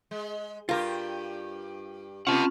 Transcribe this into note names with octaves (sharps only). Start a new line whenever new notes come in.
G#3
G2 F4 G4 A#4
C3 A#3 C4 C#4 F4 F#5 A5